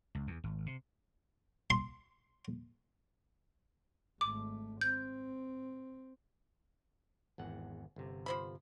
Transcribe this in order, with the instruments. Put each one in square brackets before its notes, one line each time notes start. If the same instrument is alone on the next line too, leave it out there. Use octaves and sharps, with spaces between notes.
[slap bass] C#2
E2
G#1
C3
[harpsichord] C6
[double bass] G#1 A3 [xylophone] D6
[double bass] C4 [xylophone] G6
[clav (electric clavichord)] G#1 E2 F#5
G1 C3
[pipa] F3 C5 B5